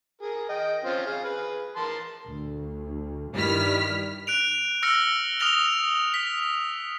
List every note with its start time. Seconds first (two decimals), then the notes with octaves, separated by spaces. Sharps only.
0.21 G#4 A#4
0.49 D#5 G5
0.85 C4 C#4 F4
1.06 G#4 F5
1.24 G#4 B4
1.76 A#4 A5 C6
2.26 D2
3.34 G2 D#3 G3 E4 F6 B6
4.27 F#6 D7 F7
4.83 E6 F6 A#6 C#7
5.40 D#6 F6 A#6 F7 G7
6.14 B6